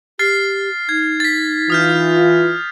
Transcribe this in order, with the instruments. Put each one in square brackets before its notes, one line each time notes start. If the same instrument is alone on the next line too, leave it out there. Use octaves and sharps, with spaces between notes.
[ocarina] G4 [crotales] F6 A6 C7
[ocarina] D#4 [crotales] G#6
[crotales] A6 B6
[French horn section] E3 F4 [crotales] D#6 F6 G6